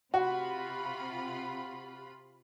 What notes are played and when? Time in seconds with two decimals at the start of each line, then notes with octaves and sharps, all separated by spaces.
0.14 C3 F4 F#4 B5